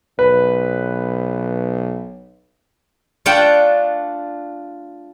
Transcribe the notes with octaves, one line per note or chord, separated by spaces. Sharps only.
B1 B4
A3 D4 F4 F#5 G5 A5